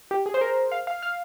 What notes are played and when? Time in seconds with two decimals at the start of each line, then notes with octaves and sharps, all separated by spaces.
0.11 G4
0.26 G#4
0.34 C5
0.41 A#4
0.72 F5
0.87 F5
1.03 F5